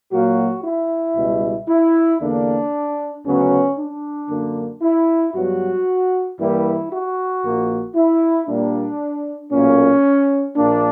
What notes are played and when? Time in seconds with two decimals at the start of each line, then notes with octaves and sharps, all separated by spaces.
0.11 A#2 F#3 A#3 F#4
0.63 E4
1.15 C#2 B2 G3
1.68 E4
2.20 E2 D3 A#3 D4
3.25 D2 C#3 F#3 B3 C#4
3.76 D4
4.29 F#2 D3 A#3
4.82 E4
5.34 G2 F#3 B3 F#4
6.38 G2 E3 G3 A#3 E4
6.91 F#4
7.43 A#1 A#2 A#3
7.95 E4
8.47 A#2 G3 A#3 D4
9.51 B1 A#2 A#3 C#4
10.56 A#1 A#2 A#3 D4